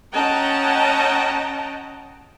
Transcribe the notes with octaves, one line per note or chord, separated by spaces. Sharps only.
C#4 D#5 F#5 G5 A5 A#5